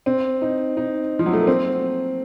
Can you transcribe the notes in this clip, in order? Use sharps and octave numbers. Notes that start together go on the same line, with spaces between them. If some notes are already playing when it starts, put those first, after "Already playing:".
C4
D#4
D#4
F3
F#3
A3
A#3
C4